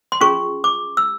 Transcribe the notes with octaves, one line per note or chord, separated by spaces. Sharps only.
C6
C#4 F4 G#4 C#6
D6
E6